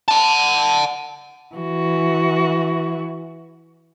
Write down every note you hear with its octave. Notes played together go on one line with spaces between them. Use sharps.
F#5 A5
E3 F#4